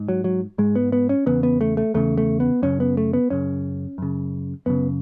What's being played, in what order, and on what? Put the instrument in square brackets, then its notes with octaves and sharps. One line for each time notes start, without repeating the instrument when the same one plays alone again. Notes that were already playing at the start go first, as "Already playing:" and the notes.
Already playing: [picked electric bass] G#2
F#3
F#3
G#2 G#3
B3
B3
C#4
E2 C#3 B3
B3
A3
A3
E2 C#3 A3
A3
B3
F#2 C#3 C#4
B3
A3
B3
F#2 C#3 C#4
F#2 C#3
F#2 C#3 B3